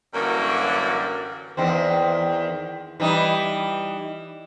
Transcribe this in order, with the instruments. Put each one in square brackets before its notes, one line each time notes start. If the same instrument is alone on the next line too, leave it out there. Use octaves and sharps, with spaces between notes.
[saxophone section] F#2 D3 E3 F#3 G3 A#3
[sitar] E2 D#3 C4
E3 G3 D#4